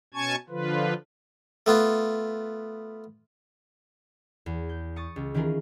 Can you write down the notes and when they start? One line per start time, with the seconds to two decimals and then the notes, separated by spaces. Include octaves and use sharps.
0.14 B2 C#4 G#5 A5 C#6 G#6
0.49 D3 F3 F4 B4
1.66 A3 B3 F4
4.46 E2
4.69 G6
4.96 C#6 D#6 A6
5.16 C#2
5.34 D#3 E3 C#4 F4 G#4 A#4